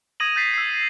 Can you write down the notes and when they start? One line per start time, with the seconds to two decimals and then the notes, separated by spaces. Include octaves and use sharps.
0.20 D#6 G#6 A#6 D#7 F#7
0.36 G6 A6 B6 C7
0.54 E6 C7